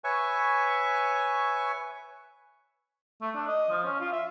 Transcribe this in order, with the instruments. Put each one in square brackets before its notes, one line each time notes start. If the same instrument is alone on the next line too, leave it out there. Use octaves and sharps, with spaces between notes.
[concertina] B4 C#5 E5 G#5 C#6
[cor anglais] A3
D4
D#5
F3
C#4
F4
E5